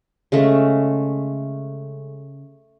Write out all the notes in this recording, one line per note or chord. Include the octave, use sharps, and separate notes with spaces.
C#3 G#3 A3